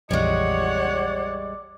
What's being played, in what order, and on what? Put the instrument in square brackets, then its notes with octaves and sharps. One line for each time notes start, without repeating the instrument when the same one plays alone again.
[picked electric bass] A#1 F2 E3 [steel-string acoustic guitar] G3 G#3 [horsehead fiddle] C#5 F#5 [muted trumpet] D5